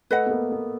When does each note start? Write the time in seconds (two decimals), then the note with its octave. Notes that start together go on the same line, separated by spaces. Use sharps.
0.11 A3 B4 D#5 F#5
0.26 B3
0.31 A#3
0.52 B3